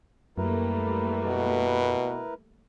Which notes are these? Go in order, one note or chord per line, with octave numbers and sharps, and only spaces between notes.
F#2 G3 A3 A#3 E4 A#4 B4
B2